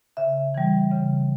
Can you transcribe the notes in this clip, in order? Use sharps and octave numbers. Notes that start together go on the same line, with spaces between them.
C#3 E5
E3 G3
C#3